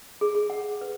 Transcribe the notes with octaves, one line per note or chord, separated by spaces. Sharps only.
G#4
G#4
F#5
B4